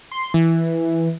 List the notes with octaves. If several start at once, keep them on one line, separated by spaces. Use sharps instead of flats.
C6
E3